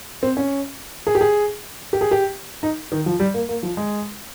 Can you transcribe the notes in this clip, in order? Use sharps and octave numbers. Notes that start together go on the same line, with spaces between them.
C4
C#4
G#4
G4
G#4
G4
G#4
G4
D#4
D#3
F3
G3
A#3
A#3
F3
G#3